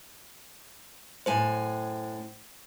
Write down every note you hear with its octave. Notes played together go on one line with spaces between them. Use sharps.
F#2 A2 C5 G#5